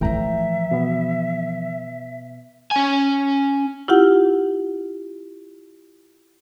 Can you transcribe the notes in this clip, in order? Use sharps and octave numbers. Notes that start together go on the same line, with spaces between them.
A2 E3 F3 E5 G5 A#5
B2 B3
C#4 G#5
E4 F4 G4 F#5